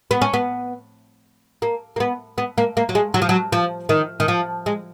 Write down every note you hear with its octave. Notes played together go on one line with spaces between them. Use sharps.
B3
C#4
B3
A#3
A#3
B3
B3
A#3
A#3
F#3
G#3
F#3
F3
F#3
F3
D#3
D#3
F3
G#3